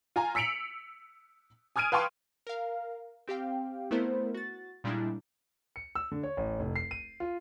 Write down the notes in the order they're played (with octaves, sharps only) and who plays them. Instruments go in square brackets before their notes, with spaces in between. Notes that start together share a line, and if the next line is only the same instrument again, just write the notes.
[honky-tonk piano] F4 G#5 A#5
E6 B6 C#7 D7 F7 F#7
G#5 D#6 F6 G#6 D7 D#7
B4 F5 G5 A5 C6 C#6
[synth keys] A#4 F5
C4 G4 F5 G5
A3 B3 E4 A#4 C5
F#4 A6
A#2 G3 G#3 D4 E4
[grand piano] C#7
E6
D3
C#5
A1
F1
C7
D#7
F4